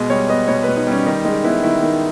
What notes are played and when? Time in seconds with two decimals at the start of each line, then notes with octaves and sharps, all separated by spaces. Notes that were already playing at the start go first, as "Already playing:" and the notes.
Already playing: B2 G#3 D#5
0.10 G3 C#5
0.29 B3 D#5
0.48 B2 C#5
0.63 B2 B4
0.76 D#4
0.87 G3 C#4
1.06 D#3 D#4
1.24 G#3 D#4
1.44 B3 E4
1.63 D#3 E4
1.82 D#3